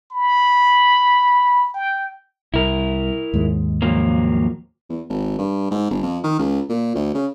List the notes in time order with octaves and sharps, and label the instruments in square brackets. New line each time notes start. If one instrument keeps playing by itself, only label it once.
[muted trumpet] B5
G5
[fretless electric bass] C2 [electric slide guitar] E4 A#4
[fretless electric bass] D#2 G#2 G#3
[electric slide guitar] F3 F#3 A#3
[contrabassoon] E2
G#1
G2
G#2
G1
F2
D#3
C#2
A#2
D2
C#3